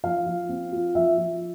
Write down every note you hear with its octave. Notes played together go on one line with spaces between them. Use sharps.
F3 F5
F3
C4
F4
F3 E5
F3